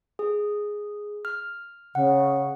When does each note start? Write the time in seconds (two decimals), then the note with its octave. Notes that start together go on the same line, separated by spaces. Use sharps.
0.19 G#4
1.25 F6
1.95 C#3 F#5